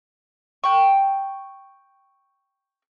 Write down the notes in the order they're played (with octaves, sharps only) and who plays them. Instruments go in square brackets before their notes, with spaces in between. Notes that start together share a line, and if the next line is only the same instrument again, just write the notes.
[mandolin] G5 C#6